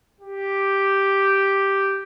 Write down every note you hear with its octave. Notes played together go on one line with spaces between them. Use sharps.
G4